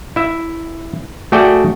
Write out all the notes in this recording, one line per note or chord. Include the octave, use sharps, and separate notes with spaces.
E4 E5
A3 F#4 G#4 A4 D5 G5